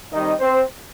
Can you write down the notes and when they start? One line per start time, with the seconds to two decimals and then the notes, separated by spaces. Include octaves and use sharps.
0.12 D#3 G3 C4 D#4 D#5
0.40 C4 C5